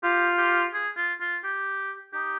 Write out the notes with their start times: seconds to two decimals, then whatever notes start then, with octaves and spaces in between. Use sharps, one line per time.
0.03 F4 G4
0.38 G4
0.74 G#4
0.97 F4
1.21 F4
1.44 G4
2.13 D#4 G4